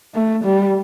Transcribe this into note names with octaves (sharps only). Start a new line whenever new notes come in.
A3
G3